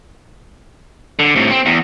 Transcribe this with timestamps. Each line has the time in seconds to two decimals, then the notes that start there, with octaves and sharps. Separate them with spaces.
1.19 D3
1.36 A2 C3
1.50 C4
1.66 E2